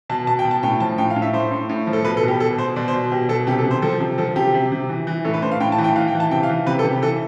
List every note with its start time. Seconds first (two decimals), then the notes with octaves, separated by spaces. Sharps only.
0.10 B2 A5
0.27 B2 A5
0.39 G5
0.45 B2
0.51 A5
0.63 A2 G5
0.80 F3 A5
0.98 A2 G5
1.10 F5
1.16 A2
1.22 E5
1.33 A2 C5
1.51 A2
1.69 A2
1.87 F3
1.93 A4
2.04 B2 B4
2.17 A4
2.23 B2
2.28 G4
2.40 B2 A4
2.58 B2 C5
2.76 B2 D5
2.88 C5
2.94 B2
3.11 B2 G4
3.29 B2 A4
3.47 C3 G4
3.59 A4
3.65 C3
3.71 C5
3.82 F3 A4
4.00 C3
4.18 F3 A4
4.36 C3 G4
4.54 C3
4.72 C3
4.89 E3
5.07 E3
5.24 A2 A4
5.34 B4
5.42 A2 C5
5.52 F5
5.60 A2 G5
5.72 A5
5.78 E3
5.84 G5
5.96 E3 F5
6.08 G5
6.14 E3
6.20 A5
6.31 C3 G5
6.43 F5
6.49 E3
6.67 C3 B4
6.79 A4
6.85 C3
6.91 G4
7.02 E3 A4